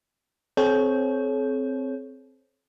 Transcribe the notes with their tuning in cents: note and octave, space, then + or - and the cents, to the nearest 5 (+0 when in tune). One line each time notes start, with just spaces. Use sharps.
C4 +0 A4 -45 C#5 +0